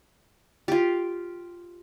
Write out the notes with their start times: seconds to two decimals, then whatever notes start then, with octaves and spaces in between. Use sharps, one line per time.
0.68 F4 G4